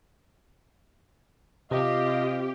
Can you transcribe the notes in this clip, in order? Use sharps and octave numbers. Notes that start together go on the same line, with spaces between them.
C3 F4 G4 D#5